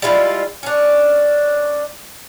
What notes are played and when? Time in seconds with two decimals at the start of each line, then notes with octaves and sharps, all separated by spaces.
0.02 G3 G#3 E4 F4
0.63 C#4 D4